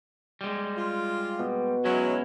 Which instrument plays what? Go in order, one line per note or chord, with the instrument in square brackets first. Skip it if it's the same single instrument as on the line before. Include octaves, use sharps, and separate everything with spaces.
[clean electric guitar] G3 G#3
[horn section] F4
[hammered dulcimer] B2
[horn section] F#3 [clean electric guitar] G#3 C#4 E4